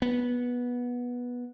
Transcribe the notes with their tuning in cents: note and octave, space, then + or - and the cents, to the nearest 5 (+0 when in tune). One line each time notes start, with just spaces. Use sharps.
B3 -15